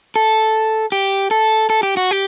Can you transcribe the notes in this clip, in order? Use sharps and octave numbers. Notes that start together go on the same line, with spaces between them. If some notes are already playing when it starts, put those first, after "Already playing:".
A4
G4
A4
A4
G4
F#4
G4